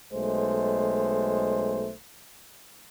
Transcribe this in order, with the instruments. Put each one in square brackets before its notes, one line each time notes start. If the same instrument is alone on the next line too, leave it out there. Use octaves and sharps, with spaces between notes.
[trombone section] B1 G#3 A3 C5